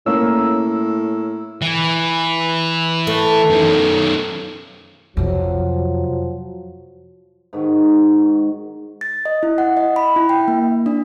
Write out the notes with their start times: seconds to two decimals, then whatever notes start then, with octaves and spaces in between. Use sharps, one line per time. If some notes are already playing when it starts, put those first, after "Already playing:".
0.06 A2 A#3 C#4 E6
1.62 E3
3.07 A3
3.50 F#2 D#3
5.17 F2 C3 F3 F#3
7.53 G#2 D#3 F#4
9.01 A6
9.25 D#5
9.43 E4
9.58 F#5
9.77 D#5
9.96 B5
10.16 E4
10.29 G5
10.48 A#3
10.86 D4